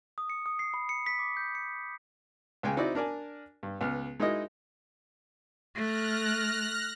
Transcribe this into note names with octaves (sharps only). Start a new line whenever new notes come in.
D#6
C#7
D#6
C7
B5
C#7
B6
D6
G6
C#7
C#2 C#3 G#3 G5 G#5
C4 D#4 E4 F#4 D5
D4 A#4 D5 G#5
G2
C#2 B3 F6
G#3 D#4 E4 F#4 A#4 D#5
A3 F6 F#6 A#6